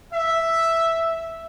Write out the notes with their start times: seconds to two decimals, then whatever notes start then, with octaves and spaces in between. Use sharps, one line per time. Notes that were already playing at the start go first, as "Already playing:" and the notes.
0.12 E5